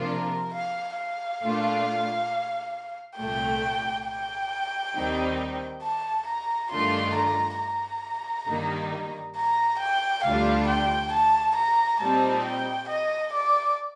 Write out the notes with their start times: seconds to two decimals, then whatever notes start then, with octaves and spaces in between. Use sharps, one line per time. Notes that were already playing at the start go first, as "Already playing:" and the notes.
Already playing: C3 F3 A#3 D4 F4
0.09 A#4
0.54 F5
0.97 F5
1.42 A#2 A3 D4 F4
3.18 C2 A#2 A3 G5
4.06 G5
4.94 D#2 D#3 G3 C4 D#4
5.83 A5
6.27 A#5
6.71 G2 D#3 A3 D4 F4 C6
7.15 A#5
7.59 A#5
8.48 G2 D#3 G3 A#3 D#4
9.36 A#5
9.79 G5
10.24 D2 C3 G3 D4 F4 F5
10.68 G5
11.13 A5
11.56 A#5
12.00 A#2 G3 C4 D#4 A5
12.44 G5
12.89 D#5
13.33 D5